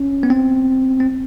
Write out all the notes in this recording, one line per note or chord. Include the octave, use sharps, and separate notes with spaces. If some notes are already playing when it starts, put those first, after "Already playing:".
Already playing: C#4
B3
C4
C4